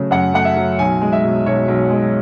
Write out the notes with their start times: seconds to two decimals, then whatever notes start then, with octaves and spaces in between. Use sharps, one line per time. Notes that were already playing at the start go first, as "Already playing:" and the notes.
Already playing: C#3 F#3 A3
0.11 F#2 F#5
0.33 A3 F#5
0.45 E5
0.57 F#3
0.79 B1 G#5
1.02 G#3
1.12 E5
1.24 B2
1.46 B1 C#5
1.68 B1
1.91 G#3